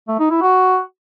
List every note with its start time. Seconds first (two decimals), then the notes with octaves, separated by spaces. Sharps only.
0.08 A3
0.19 D#4
0.30 E4
0.41 F#4